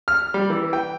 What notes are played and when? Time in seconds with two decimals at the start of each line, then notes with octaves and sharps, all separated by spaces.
0.08 F6
0.34 G3
0.50 E3
0.73 G5